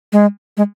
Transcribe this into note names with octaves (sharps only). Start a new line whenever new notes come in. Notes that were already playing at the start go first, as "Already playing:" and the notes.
G#3
G#3